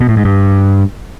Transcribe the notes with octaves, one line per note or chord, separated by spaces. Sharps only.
B2
A2
G#2
G2